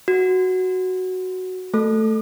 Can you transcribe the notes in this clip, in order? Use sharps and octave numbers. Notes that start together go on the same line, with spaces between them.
F#4
A3 A4